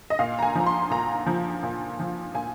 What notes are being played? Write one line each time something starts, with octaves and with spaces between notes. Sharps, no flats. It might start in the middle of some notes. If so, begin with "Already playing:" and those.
D#5
A#2 F5
A#5
G#5
F3 A#5
C6
A#2 A#5
F3
A#2
F3
A#2 G#5